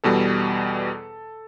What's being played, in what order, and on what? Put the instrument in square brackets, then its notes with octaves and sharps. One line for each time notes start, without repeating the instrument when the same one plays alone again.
[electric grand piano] E2 B2 G3 A4